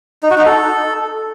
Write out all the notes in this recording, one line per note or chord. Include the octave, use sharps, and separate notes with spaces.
D#4
F#4
D#4
A4